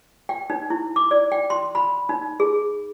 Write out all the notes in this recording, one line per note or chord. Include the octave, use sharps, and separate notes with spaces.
G5
D#4
E4
D6
D5
G5
C6
B5
D#4
G#4